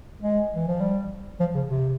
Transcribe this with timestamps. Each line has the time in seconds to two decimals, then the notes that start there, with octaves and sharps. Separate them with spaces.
0.22 G#3
0.55 E3
0.68 F3
0.81 G3
1.40 F3
1.55 C#3
1.69 C3